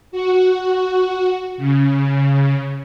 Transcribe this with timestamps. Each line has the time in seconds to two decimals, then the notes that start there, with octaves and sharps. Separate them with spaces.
0.11 F#4
1.58 C#3